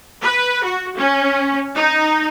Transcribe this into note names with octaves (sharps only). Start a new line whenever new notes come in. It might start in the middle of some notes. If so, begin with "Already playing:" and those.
B4
F#4
C#4
D#4